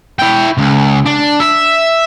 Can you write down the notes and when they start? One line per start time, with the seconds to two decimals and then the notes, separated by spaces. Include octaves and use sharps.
0.19 E4 G5
0.58 C#2
1.06 D4
1.40 E5